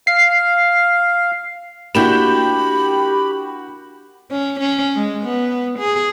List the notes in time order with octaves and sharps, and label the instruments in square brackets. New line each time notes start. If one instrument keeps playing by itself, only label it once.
[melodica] F5 [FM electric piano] C7
[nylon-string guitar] A#3 D4 E4 [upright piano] F#4 G6 E7 [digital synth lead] G4 [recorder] B5
[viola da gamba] C#4
C#4
G#3
B3
G#4